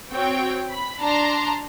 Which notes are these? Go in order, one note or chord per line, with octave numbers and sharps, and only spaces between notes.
C4 F#4 C#5 G5
B5
D4 A5 A#5 C6